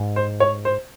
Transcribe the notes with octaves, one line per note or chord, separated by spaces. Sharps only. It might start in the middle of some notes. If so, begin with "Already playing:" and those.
Already playing: G#2
C5
C#5
C5